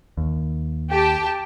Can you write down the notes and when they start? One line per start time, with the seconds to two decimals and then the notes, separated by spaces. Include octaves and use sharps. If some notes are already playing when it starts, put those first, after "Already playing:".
0.17 D#2
0.91 G4 A5